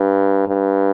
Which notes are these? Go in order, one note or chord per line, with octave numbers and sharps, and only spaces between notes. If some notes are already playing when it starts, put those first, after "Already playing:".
Already playing: G2
G2